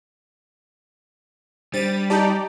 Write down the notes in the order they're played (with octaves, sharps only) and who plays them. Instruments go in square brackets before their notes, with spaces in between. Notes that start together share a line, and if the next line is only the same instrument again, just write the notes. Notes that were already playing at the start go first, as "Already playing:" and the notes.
[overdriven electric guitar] G3 [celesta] D4 C5 [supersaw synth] A6 D#7
[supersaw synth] D#4 G4 D5 [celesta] A5 A#5 G6